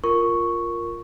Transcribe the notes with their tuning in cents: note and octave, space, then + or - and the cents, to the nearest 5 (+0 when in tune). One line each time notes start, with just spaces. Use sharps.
F4 +0 A#4 +0 C#6 +0